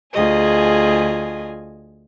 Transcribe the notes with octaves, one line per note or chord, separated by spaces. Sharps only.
D2 F4 G#4 D#5 G#5